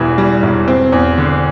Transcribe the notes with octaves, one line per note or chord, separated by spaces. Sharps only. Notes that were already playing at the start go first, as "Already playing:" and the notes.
Already playing: E1 E2 E3 G3
G3
E1
C4
E2
D3